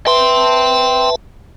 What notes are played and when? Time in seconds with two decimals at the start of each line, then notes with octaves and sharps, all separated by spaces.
0.07 B4 E5 G5 A5 C6